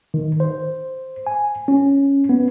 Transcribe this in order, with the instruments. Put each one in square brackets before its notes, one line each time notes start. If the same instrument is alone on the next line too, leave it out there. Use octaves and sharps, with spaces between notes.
[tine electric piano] D#3
C5
G#5
C#4
B3